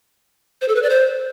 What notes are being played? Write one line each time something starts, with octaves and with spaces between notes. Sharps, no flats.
C5
A4
B4
D5
C5